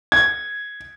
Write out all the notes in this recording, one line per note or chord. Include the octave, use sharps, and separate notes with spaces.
G#6